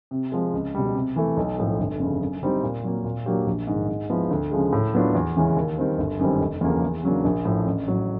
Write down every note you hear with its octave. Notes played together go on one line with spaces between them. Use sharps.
C3
F3 G#3
C#2
B2 G3
C3
E3 A3
B1
A2 F3
G1
F2 C#3
F#2
D3 G3 C4 D#4
A#2
F#3 A#3
A#2
F#3 A#3 D4 G4
A#1
G#2 D#3
G#2
F3 G#3 B3 E4
D2
C#3 F3 G#3
A2
F#3 B3 D4 F4
E2
C#3 E3 G#3 C#4
D#2
D#3 G3 C4
G1
F#2 D#3 G3 C4
F1
E2 C#3 F3 A#3
E2
C#3 F#3 A#3 D4
A#1
A2 F3
A1
A2 F#3